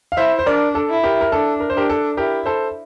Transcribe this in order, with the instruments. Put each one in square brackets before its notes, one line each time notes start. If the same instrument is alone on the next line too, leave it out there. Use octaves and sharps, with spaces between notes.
[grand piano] F5
[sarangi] E4 [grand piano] C5 E5
[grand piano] C5
[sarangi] D4 [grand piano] A#4 D5
[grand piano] A4
[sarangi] E4
[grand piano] G4 A#4
A#4
[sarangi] D4 [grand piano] A4
[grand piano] A#4
C5
[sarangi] D4 [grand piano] G4 A#4
[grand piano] A4
[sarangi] E4 [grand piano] G4 A#4
[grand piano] A4 C5